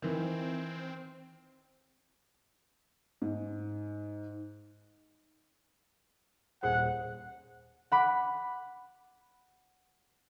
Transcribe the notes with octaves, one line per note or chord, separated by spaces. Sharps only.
D#3 E3 C4
G#2
D#1 G#4 C5 F#5
F#5 B5 D6